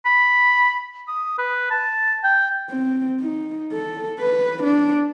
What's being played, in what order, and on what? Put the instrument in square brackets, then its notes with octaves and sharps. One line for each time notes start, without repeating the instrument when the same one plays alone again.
[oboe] B5
D#6
B4
A5
G5
[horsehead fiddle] C4
D#4
A4
B4
D4